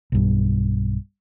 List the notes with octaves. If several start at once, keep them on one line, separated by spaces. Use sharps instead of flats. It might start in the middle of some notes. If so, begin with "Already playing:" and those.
B1 G2